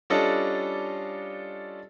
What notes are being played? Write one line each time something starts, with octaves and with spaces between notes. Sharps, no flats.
G3 C#4 D4 F4 A4 D#5